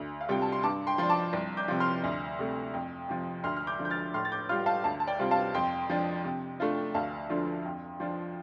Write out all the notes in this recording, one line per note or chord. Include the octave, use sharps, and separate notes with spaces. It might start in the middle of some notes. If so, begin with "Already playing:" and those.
Already playing: D2
F5
C3 G3 F4 G5
A5
C6
G2 A5 D6
G5 C6
F3 D4 C6
A5 D6
C2
D6 G6
C3 F3
C6 F6
D2
C3 A3
F2
C3 F3
D2 C6 F6
F6
D6 G6
D3 F3
G6
F6 A6
A2 C6 F6
A6
D6 G6
G3 F4 C6 F6
F5 A5
D2 F5 A5
A5
D5 G5
C3 G3 C4 F4
F5 A5
F2 G5 C6
F3 D4
C3
A3 D4 F4
D2 F5 A5
D3 F3 D4 F4
F2
F3 D4 F4